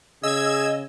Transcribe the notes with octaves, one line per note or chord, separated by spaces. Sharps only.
C#3 G#4 D#5 E6 G#6